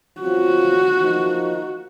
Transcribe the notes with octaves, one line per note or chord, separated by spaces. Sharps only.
F#3 C4 F4 F#4
F3 A#3 D#4